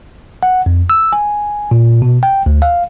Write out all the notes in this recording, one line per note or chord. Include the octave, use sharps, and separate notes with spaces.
F#5
F2
E6
G#5
A#2
B2
G5
D2
F5